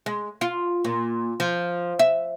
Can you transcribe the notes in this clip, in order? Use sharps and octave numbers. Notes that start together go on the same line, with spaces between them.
G#3
F4
A#2
F3
E5